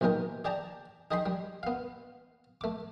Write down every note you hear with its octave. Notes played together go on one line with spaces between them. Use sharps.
B1 A#2 E3 D#4 A#4 G5
G#4 D5 G5 A5 A#5
D#4 G#4 D#5 G5 B5 C6
G3
B3 F5
A3 D6